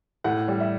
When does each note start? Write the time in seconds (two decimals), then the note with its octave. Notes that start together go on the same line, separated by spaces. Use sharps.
0.24 A2 F#5
0.48 G3
0.60 E5